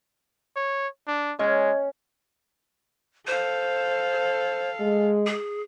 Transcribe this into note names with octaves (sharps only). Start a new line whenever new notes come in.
C#5
D4
G#3 C#4 D#5 G#6
A4 C5 F5
G#3
G#4